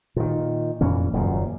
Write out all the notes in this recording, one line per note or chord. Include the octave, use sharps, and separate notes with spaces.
A#2 D#3
F2 A#2 E3 C#4
D#1 F#2 A#2 C#3